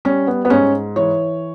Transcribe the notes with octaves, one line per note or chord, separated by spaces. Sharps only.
G3 C#4
B3
B3
G#2 C#4
E3 C#5